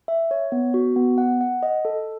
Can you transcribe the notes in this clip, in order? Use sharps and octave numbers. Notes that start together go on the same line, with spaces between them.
E5
C#5
B3
F#4
B3
F#5
F#5
D#5
A4